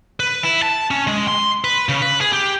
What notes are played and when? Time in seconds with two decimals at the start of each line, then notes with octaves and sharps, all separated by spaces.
0.20 B4
0.43 E4
0.62 A5
0.91 C#4
1.07 G#3
1.28 C6
1.64 B4
1.89 C#3
2.02 B4
2.21 G#4
2.33 G4